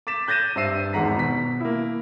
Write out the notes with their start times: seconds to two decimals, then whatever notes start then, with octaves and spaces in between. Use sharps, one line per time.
0.07 D6 A6 B6 E7
0.28 F#6 G6 A6 A#6 D#7 E7
0.56 G2 C5 E5 E6 C7 D#7
0.93 G#1 E2 G#3 F#5 A#5 B6
1.16 B2 B6
1.60 A#3 E4